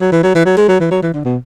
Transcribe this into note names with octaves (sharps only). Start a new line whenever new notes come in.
F#3
E3
F#3
E3
F#3
G#3
F#3
E3
F#3
E3
D3
B2